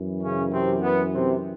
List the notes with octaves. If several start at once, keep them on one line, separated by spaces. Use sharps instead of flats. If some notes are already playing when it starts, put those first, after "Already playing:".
Already playing: F#2 E3
C#3 C#4
C3 C4
B3
C3 C4